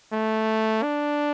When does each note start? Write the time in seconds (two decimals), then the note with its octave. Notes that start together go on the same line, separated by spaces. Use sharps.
0.12 A3
0.83 D4